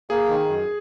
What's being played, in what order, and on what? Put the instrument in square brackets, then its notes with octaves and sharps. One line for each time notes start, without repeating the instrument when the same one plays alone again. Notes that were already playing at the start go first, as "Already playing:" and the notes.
[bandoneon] A#3 [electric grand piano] G#4
[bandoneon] D#3
F#2